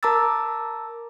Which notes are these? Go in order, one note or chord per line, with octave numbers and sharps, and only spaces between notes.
A#4 A5 A#5 D6 E6 A6